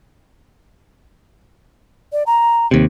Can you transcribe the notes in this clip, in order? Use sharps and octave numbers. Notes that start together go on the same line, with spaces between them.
D5
A#5
D#2 C3